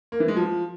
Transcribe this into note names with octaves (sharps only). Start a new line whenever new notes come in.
A#3
E3
G#3
F3